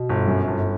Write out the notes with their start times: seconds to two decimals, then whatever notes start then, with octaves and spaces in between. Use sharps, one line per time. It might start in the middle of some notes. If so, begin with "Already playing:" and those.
Already playing: B2
0.09 G1
0.28 F#2
0.48 G1